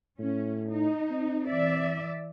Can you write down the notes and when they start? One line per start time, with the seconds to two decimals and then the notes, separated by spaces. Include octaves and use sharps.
0.19 A2 C#4
0.70 D#4
1.11 C4
1.48 E3 D5 E5